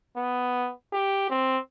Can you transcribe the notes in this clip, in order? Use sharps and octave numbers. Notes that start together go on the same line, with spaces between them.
B3
G4
C4